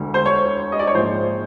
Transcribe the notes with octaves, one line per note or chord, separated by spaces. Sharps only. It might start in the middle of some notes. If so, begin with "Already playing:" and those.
Already playing: E1 D2 D3
C5
C#5
D#5
D5
C#5
A#1 G#2 F3 G#3 C5